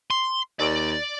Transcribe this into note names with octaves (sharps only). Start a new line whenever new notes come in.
C6
D#2 D5